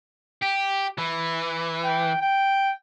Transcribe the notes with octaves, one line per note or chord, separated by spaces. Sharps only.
G4
E3
G5
G5